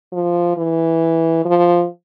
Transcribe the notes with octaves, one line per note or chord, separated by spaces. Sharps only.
F3
E3
F3